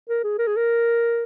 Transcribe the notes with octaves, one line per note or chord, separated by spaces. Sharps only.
A#4
G#4
A#4
G#4
A#4